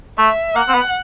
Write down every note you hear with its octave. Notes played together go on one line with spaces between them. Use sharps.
A3 E5
A#3 F#5
C4
B3